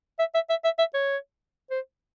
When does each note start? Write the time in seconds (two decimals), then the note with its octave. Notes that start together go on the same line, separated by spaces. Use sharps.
0.19 E5
0.35 E5
0.50 E5
0.65 E5
0.79 E5
0.94 C#5
1.71 C5